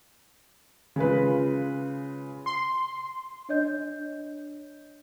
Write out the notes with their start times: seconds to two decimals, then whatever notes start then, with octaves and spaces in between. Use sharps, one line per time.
0.96 C#3 G#3 F4 B4
2.46 C6
3.49 D4 C#5 D#5 G6